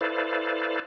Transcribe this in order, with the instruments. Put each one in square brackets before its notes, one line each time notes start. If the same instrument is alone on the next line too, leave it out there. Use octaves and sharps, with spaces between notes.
[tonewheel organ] E4 A4 B4 C5 D5 F5